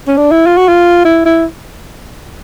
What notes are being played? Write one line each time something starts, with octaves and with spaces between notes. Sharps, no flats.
C#4
D4
E4
F4
F#4
F4
E4
E4